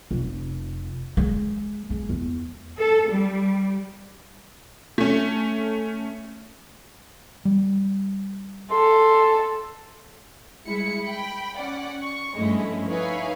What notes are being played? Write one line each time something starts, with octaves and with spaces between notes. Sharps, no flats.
F1
G#3
G#3
E2
A4
G3
A3 C#4
G3
A4 C6
G3 G#3 E4 C#7
G5 B5
C#4 D5 F#5
C#6
G2 F3 G#3 A3 C#4 E4
D#4 E4 B4 C#5 F5 G#5